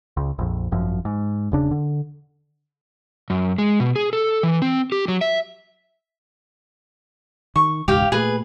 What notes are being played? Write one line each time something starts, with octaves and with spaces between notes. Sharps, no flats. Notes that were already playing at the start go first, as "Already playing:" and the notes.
C#2
A#1 F2
G#1 F#2 F3
G#2
E1 C#3 D4
D3
F#2
G#3
B2
G#4
A4
E3
C4
G4
F#3
E5
D#3 C#6
E1 C#2 G#2 G4 F5 G5
A#2 A3 G#4 B4